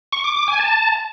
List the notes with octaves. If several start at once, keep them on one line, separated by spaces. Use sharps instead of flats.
C#6
D6
D6
G#5
A5